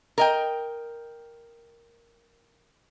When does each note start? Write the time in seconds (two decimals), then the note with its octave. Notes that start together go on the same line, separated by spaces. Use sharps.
0.18 A#4 D#5 G5